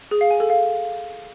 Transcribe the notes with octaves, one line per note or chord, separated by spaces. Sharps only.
G#4
F5
G#5
A4
F5